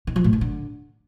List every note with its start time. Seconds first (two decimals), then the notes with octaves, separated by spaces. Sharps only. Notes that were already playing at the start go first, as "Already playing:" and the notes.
0.07 D#3
0.16 F3
0.24 A2
0.33 D#3
0.41 D3